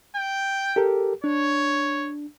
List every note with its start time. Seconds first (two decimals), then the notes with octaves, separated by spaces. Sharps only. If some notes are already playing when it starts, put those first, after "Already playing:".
0.16 G5
0.76 G4 A4 A#4
1.24 D4 C#5